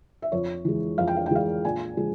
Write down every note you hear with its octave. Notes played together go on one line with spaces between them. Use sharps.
E5
F2 C#5
E3 G#3
F2 F5
G5
F5
G5
E3 G#3 F5
A#2 G#5
F3 G#3